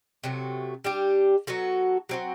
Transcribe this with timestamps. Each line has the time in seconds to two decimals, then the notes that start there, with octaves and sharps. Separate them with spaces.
0.24 C3 F#3 A3
0.84 G3 D4 G4
1.47 F#3 B3 F#4 A4
2.09 F#3 C4 F#4